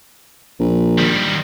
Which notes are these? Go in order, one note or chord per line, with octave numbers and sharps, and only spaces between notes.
A#1
D#3 G3